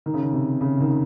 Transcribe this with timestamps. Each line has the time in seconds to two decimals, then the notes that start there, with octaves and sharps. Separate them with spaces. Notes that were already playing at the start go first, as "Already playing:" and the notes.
0.06 D#3
0.14 C#3
0.23 D#3
0.33 C3
0.61 C#3
0.80 D#3